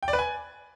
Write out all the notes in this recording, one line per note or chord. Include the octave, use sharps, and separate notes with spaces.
G5
D5
B4
G#5